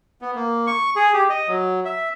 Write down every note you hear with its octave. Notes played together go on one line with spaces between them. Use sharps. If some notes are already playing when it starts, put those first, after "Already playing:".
B3
A#3
C#6
G#4
G4
D#5
F#3
E5